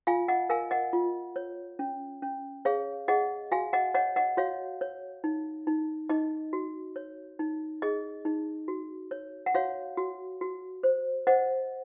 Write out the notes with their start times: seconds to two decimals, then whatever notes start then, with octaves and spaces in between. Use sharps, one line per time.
0.07 F4 F5 G#5
0.28 D#5 F#5
0.50 A#4 F5 G#5
0.71 D#5 F#5
0.93 F4
1.36 C#5
1.79 C#4
2.22 C#4
2.65 G#4 C#5 F5
3.08 G#4 D#5 F#5
3.52 F#4 F5 G#5
3.73 D#5 F#5
3.94 C#5 D#5 F#5
4.16 D#5 F#5
4.37 F#4 C#5 F5
4.81 C#5
5.24 D#4
5.67 D#4
6.09 D#4 D#5
6.53 F#4
6.96 C#5
7.39 D#4
7.82 G#4 D#5
8.25 D#4
8.68 F#4
9.11 C#5
9.46 F#5
9.54 F#4 C#5 F5
9.97 F#4
10.41 F#4
10.83 C5
11.27 C5 D#5 F#5